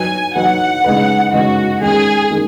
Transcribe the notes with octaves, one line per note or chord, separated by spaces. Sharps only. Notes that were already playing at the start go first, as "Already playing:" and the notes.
Already playing: F#3 D#4 B4 G#5
F#3 D#4 B4 F#5
C#3 G#3 D#4 B4
C#3 G#3 D#4 F#4 B4
D#3 G#3 C#4 G#4
D#3 G#3 C#4